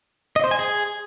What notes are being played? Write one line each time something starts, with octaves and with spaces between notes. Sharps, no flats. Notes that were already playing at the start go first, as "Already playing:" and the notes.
D#5
C5
G#5
G#4